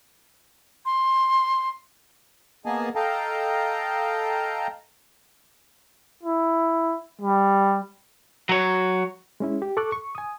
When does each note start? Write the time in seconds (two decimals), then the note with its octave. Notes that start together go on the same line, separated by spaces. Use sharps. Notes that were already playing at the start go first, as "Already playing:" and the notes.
0.86 C6
2.66 A#3 B3 G#4 D#5 G#5 A5
2.95 A4 D#5 F5 G5 A5 A#5
6.23 E4
7.22 G3
8.49 F#3 C#5
9.40 G#3 C#4 E4
9.62 G4
9.77 A4 C#6 D6 F#6
9.92 C#6
10.15 G#5 D#6